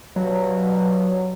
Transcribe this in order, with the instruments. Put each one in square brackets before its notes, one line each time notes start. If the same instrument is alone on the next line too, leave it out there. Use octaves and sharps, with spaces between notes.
[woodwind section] G2 B2 [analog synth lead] F#3